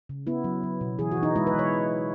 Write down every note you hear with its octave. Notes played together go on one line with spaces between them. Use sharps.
C#3
B3 E4
F#3
F#3
B2
E3 G#4
F#4
E3
D#4
G#3 E4
B4
E3
C#5